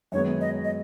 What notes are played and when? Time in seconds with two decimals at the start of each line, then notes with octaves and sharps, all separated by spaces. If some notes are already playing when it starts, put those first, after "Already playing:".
0.12 F#2 D#3 G#3 B3 C#5
0.41 D#5
0.64 D#5